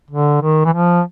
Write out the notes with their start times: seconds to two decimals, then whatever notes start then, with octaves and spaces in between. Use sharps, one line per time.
0.11 D3
0.41 D#3
0.65 E3
0.73 F3